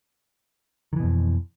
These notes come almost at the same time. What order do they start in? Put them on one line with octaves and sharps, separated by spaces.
D#3 E3 B2 F2